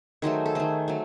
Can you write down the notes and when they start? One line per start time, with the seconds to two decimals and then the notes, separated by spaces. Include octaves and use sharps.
0.22 D#3 F#3 A3 G#4 C5
0.46 A4
0.55 D#3 A3 G#4 C5
0.88 F#3 A3